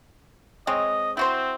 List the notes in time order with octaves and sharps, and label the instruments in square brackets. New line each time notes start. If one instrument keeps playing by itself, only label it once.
[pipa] G#3 C4 C#5 [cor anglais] D#5
[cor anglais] C4 [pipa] E4 F#4 C5